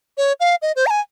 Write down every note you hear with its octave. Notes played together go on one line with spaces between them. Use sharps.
C#5
F5
D#5
C5
A#5
G#5